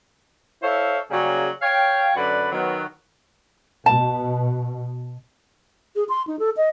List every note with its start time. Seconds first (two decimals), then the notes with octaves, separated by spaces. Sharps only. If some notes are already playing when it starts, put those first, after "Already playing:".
0.63 E4 A4 C5 C#5 E5 F5
1.10 C#3 F#3 G3 A#3 C#4 G#4
1.62 C#5 F5 G5
2.15 F#2 D3 F#4 B4 D5 B5
2.52 D#3 F#3 B3
3.86 B2 A5
5.96 G#4
6.09 C6
6.27 D#4
6.39 A4
6.57 D#5